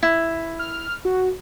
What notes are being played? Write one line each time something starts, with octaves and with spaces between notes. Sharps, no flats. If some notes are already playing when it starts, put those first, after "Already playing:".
E4
F6
F#4